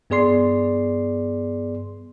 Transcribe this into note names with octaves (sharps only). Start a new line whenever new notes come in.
G2 B3 G#4 D5 C6 C7